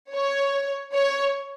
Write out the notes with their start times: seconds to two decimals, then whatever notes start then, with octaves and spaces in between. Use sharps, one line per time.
0.12 C#5
0.91 C#5